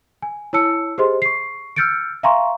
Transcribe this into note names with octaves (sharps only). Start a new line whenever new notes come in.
G#5
E4 C#5 A5 E6 C#7
G4 G#4 C5 D#5 C6
C#6 C7
E6 F6 G6 A6 C#7 D7
E5 F5 G#5 A#5 C6 C#6